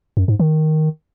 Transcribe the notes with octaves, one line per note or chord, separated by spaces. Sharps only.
F#2
G#2
D#3